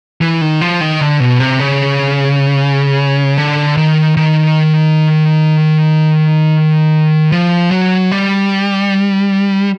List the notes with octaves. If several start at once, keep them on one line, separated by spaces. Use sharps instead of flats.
E3
D#3
F3
D#3
D3
B2
C3
C#3
D3
D#3
D#3
F3
F#3
G3